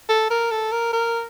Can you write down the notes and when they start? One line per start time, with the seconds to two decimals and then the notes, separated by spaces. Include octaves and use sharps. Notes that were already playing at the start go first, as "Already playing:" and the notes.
0.09 A4
0.30 A#4
0.51 A4
0.72 A#4
0.93 A#4